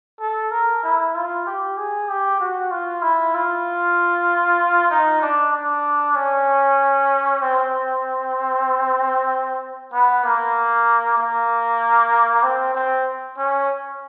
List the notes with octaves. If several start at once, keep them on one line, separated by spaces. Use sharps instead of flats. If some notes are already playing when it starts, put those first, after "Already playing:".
A4
A#4
E4
F4
G4
G#4
G4
F#4
F4
E4
F4
D#4
D4
D4
C#4
C4
B3
A#3
A#3
C4
C4
C#4